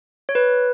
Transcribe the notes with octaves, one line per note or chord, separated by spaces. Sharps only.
C#5
B4